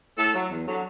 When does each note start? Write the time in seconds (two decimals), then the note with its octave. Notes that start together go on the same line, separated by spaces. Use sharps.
0.18 A2 A4
0.35 F#3
0.50 E2
0.67 D3 F#3